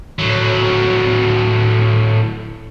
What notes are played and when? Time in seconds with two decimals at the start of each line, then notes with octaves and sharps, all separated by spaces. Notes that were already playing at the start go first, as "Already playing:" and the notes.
0.19 A2 F#3